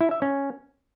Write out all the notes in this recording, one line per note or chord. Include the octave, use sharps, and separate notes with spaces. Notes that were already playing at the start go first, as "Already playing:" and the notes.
E4
E5
C#4